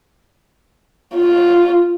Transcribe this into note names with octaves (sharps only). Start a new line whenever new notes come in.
F4